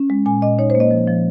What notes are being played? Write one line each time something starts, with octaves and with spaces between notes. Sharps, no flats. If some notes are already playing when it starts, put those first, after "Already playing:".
Already playing: C#4
G#3
A#2 G#5
A#2 D#5
D#4 C#5
C5
A#3
D#5
F3
F3